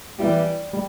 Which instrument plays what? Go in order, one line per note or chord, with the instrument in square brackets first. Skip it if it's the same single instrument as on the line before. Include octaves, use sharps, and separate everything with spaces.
[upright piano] E3 B3 E4 G4 [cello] G3
[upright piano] G3